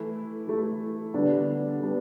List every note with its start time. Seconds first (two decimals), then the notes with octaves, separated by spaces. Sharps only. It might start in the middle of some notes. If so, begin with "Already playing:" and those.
Already playing: E3 A3 E4
0.47 E3 A3 E4
1.14 D3 G3 B3 D4
1.80 D3 G3 B3 D4